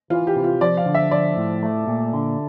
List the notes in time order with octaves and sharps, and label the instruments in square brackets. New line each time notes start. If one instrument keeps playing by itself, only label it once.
[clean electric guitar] E3 [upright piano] F4
[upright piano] G4
[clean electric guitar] C3
[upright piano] F4
[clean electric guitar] F3 [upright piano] D5
[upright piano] F5
[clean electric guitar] D3
[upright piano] E5
[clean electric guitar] F3 [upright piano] D5
[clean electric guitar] A2
A3
A#2
D3